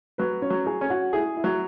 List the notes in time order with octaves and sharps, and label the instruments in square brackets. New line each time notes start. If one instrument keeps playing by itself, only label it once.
[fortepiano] F#3 [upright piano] B4
[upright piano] C#4 C#5
[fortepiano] F#3
[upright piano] G#4 G#5
[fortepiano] C#4
[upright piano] F#4 F#5
[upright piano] E4 E5 [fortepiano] G#4
[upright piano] E4 E5
[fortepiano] F#3